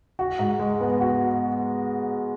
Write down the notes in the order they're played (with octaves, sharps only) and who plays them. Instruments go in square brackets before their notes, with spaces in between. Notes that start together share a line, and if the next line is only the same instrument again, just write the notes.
[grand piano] F#4
G#2
G#3
B3
F#4